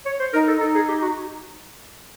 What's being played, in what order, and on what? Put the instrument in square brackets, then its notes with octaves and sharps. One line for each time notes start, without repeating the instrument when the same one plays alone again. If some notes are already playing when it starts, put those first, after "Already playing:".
[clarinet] C#5
C5
[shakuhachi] D#4 [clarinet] A#4
[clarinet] A4
[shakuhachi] D#4 [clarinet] A4
[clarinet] G#4
G4
F#4